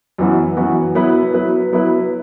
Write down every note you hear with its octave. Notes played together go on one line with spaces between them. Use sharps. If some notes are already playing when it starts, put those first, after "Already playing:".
F#2 E3 B3 F#4
F#2 E3 B3 F#4
F#3 B3 E4 B4
F#3 B3 E4 B4
F#3 B3 E4 B4